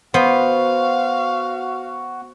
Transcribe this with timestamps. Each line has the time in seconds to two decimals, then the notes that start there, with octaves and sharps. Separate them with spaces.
0.14 B3 F#4 C5 F5